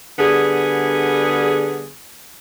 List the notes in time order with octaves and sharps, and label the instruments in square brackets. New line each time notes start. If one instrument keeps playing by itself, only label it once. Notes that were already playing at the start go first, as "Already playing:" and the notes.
[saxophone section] D3 G3 B3 G#4